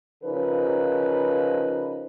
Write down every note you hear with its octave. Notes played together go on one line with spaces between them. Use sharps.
C#3 F3 D#4 A#4 B4